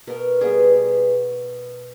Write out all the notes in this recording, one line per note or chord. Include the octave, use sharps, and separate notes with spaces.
B2 A#4
G3 B3 G#4
B2